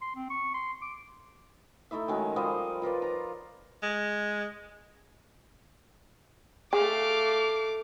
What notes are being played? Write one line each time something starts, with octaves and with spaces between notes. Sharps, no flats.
C6
C4
C#6
C6
D6
A3 D#4 E4 E5
D#3 F#3 G#3 C#4
F3 G3 C5 D#5
F4 A#4 B4 D5
A#5
G#3
A3 G#4 F5 D6